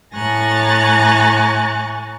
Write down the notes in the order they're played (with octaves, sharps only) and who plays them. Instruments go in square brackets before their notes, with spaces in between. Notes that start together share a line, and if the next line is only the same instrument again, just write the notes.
[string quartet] A2 G#5 A#5 C#6 F#6 A6